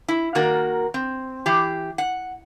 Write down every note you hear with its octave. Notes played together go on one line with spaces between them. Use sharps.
E4
D#3 A#3 F#4 A#4
C4
E3 G4
F#5